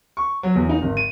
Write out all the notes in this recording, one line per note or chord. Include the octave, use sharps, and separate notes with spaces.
C#6
F#3
E2
D#4
G#1
D#7